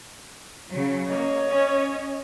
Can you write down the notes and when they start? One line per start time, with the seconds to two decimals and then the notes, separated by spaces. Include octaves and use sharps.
0.69 C#3 F#3
1.08 A#3 C#5 D#5
1.50 C#4